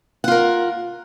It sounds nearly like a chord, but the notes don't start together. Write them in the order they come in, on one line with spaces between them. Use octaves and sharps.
F#5 F4 A#4